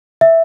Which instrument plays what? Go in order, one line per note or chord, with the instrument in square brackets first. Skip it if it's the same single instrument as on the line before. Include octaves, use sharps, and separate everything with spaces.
[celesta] E5